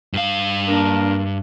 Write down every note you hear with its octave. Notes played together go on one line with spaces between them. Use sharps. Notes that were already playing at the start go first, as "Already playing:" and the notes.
G2 F5
A#3 D4 A#4